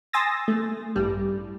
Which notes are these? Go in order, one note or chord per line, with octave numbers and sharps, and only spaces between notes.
G#5 C6 D#6 E6 A6 A#6
A3
A1 G2 G3